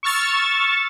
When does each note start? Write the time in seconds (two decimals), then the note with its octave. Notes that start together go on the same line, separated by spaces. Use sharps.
0.03 C#6 E6 F6 A6